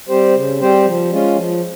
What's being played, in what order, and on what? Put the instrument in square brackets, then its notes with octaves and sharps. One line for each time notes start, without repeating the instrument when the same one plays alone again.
[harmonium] G3 C4 G4 C5
C#3
G3 C4 G4 C5
F3
G#3 C#4 F4
F3